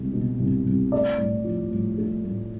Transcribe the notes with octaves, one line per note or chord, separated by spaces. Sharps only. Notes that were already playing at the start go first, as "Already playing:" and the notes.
Already playing: C2 G#3
B2
C2
C2
A3 D5
A2
F3
A2
A3
A2